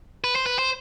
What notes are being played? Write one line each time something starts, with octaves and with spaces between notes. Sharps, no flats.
B4
C5
B4
C5